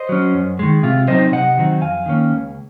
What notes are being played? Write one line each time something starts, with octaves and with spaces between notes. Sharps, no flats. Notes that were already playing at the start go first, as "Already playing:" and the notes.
Already playing: C5 D#5
F#3 C#4
F#2
D#3 G#3
C3 F4
F#3 C4 D#4 C5 D#5
C3 D#5 F#5
D#3 F#3 C4 D#4
F2 F5 G#5
D#3 A#3 C#4
C#2